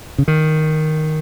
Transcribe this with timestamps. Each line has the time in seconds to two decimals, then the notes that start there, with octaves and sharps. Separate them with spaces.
0.18 C#3
0.28 D#3